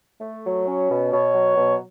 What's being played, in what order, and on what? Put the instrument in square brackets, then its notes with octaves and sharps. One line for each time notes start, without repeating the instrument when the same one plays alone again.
[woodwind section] A3
F#3
C#4
B2
[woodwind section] B2 [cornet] C#5
[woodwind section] F#3
B2